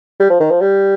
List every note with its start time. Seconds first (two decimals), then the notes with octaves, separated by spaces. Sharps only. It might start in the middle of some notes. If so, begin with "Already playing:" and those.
0.20 G3
0.30 F3
0.40 D#3
0.51 F3
0.61 G3